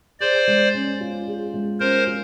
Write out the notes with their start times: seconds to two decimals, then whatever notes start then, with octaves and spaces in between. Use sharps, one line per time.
0.20 G#4 C5 D5
0.48 G#3
0.74 C#4
1.01 F4
1.28 G#4
1.54 G#3
1.80 C#4 A#4 C5
2.07 F4